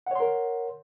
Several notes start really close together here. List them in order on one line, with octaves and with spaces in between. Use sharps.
F#5 C#5 C6 A#4